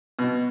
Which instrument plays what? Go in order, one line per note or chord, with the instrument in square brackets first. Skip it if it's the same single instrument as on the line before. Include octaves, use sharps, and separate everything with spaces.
[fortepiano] B2